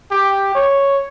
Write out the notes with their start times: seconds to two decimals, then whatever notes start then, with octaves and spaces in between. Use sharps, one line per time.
0.11 G4
0.55 C#5